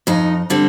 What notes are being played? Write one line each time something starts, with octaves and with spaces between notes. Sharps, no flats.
F2 D#4
D3 G3 C4